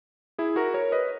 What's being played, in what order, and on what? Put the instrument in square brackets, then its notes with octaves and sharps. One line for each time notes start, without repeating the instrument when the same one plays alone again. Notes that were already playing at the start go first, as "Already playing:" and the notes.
[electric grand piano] E4 G#4
F#4 A#4
A#4 C#5
B4 D#5